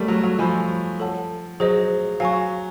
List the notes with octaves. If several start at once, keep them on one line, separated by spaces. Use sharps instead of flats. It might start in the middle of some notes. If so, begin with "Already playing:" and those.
Already playing: G3 A3 A#4 C#5 E5
F#3
F#3
F3 D#5 G#5 B5 E6 G6
A4 C#5 F#5 A5
F#3 G#4 C5 D#5
F#3 F5 G#5 C#6